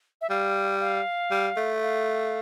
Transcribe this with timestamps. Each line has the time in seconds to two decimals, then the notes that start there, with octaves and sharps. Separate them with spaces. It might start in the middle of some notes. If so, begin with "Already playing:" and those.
0.21 E5
0.30 G3 F5
0.80 F5
1.31 G3
1.57 A3
1.82 F5